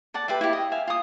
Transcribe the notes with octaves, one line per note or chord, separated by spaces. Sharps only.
A4 D5 F#5 A5
G4 B4 C5 E5
E4 F4 G4
D#5
E5 F5 G#5
F4 D#6